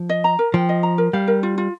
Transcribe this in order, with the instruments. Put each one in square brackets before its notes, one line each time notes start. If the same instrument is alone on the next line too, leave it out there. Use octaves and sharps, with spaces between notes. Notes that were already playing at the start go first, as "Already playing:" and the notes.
Already playing: [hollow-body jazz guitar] F3
[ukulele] D#5
A#5
A#4
[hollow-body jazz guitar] F3 [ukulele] G5
[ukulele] D#5
A#5
A#4
[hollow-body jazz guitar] G3 [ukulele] F5
[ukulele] A#4
F4
F4